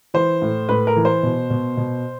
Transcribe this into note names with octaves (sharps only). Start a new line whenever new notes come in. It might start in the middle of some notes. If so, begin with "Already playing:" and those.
E3 C5
A2
A2 B4
A#4
E3
C5
B2
B2
B2